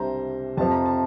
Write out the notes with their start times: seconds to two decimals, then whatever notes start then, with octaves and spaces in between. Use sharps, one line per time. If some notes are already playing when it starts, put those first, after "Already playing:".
Already playing: C2 C3 G3 D4 C5 A#5
0.57 F2 C3 F3 A5
0.71 A#5
0.86 A5